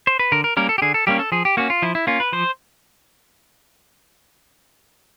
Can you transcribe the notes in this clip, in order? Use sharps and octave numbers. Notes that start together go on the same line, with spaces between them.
C5
B4
D3 A#4
A#4
G3 A#3 C#4 A#4
A4
G4
D3 G#4
A4
G3 A#3 C#4 G4
A4
F3 G#4
G4
A#3 C#4 F#4
F4
F3 E4
E4
A#3 C#4 F4
B4
F3 C5